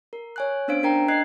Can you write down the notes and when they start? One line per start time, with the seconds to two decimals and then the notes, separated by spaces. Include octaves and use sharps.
0.13 A#4
0.36 C#5 G#5 F#6
0.68 B3 C#4 D4 C5 F5 D7
0.83 D4 A#4 G5 A#5
1.08 D4 D#5 F#6 G#6 C7